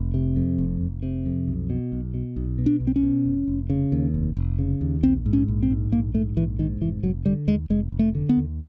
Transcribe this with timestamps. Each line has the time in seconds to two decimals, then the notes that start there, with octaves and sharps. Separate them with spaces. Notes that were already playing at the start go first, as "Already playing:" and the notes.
Already playing: F1
0.14 C3
0.36 F2
0.58 F1
0.81 F1
1.03 C3
1.26 F2
1.48 B1
1.70 B2
1.92 B1
2.14 B2
2.36 B1
2.58 B2
2.66 D4
2.80 B1
2.87 C4
2.96 C#4
3.03 B2
3.25 F1
3.48 F1
3.70 C#3
3.92 D#2
4.14 F1
4.37 F1
4.59 C#3
4.81 D#2
5.03 A#1 C4
5.26 G#2
5.33 C#4
5.48 A#1
5.63 C4
5.70 G#2
5.92 A#1 A#3
6.15 G#2 A3
6.36 A#1 E3
6.59 G#2 D#3
6.81 F1 E3
7.03 F1 F#3
7.26 D3 G3
7.47 D#2 G#3
7.70 F1 G#3
7.92 F1
7.99 A3
8.15 D3
8.29 B3
8.37 D#2